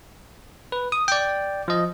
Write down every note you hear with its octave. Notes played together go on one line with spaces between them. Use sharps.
B4
D#6
D5 G5
F3 D#5